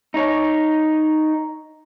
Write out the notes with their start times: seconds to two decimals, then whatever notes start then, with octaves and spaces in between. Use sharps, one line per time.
0.14 D#4 C#5